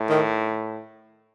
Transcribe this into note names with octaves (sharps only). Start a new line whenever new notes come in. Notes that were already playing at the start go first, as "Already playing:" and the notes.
Already playing: A2
D#3